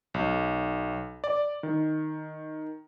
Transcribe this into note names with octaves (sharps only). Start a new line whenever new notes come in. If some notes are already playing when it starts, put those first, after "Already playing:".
B1
D5
D#3